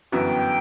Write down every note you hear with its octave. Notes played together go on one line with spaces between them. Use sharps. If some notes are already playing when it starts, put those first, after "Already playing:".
G1 F#2 E3 B3 F#4 G5